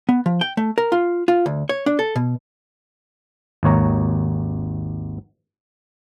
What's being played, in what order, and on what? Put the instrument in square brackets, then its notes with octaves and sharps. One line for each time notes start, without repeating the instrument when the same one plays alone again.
[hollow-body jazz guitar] B3
F3
G5
A3
A#4
F4
F4
D2
C#5
D4
A4
B2
[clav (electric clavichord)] G#1 D#2 C#5 A#5